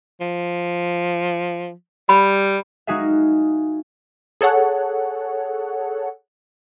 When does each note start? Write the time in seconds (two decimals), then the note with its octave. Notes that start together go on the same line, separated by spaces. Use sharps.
0.21 F3
2.09 G3 B5
2.87 G#3 D#4 F#4 G#4 E5 F5
4.41 G#4 A4 C#5 F#5